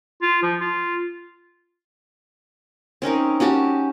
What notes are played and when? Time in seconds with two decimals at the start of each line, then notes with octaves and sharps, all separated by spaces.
0.22 F4
0.43 F3
0.61 F4
3.02 C4 C#4 D#4 A#4
3.40 C#4 F#4 G4 A5